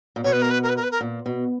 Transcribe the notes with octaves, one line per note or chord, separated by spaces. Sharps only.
A#2
B2 C#5
B4
A#4
B4
A#4
B4
A#4
B4
A#4
A#2
B2